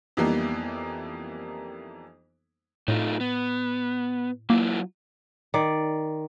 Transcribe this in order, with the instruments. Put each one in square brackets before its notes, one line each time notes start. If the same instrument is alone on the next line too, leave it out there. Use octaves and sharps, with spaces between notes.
[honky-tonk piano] F2 E3 G3 A#3 B3 D#4
[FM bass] A2 [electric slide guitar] A3 D#4 F4
[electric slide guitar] B3
[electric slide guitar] F#3 E4 F4 [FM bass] A#3
[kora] D#3 D5